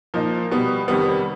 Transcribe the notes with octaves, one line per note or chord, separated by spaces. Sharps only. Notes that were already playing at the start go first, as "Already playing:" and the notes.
A#2 F3 A#3 D#4
B2 G3 B3
F2 C3 D#3 G3 B3